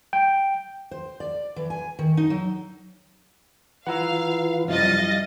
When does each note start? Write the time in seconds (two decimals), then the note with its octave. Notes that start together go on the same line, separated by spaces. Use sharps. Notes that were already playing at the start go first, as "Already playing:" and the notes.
0.13 G5
0.91 C5
1.20 D5
1.56 E3
1.70 G#5
1.99 D#3
2.17 D#4
2.30 F#3
3.87 E3 F4 B4 F5 F#5 A#5 E6
4.68 F#2 C3 F3 G3 E4 D#5 F5 A6